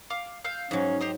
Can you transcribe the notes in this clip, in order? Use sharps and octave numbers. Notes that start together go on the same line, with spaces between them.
F5 D6
F5 E6 G6
G#2 F#3 C#4
G4 C5 D#5